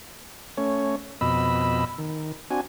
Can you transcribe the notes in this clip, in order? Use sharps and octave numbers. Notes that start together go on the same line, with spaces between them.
A3 C#4 C#5
F2 B2 D#5 B5 E6
D#3
C4 D4 F#4 G#5